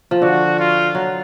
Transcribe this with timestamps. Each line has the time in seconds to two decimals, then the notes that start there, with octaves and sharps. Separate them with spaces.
0.11 F3
0.22 D3 F#4
0.59 F4
0.95 F#3